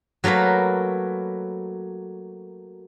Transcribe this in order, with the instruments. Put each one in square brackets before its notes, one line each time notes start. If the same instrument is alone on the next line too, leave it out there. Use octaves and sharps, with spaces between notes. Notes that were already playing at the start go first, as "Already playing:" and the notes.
[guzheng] F#3 A3 A#3 A#4 B4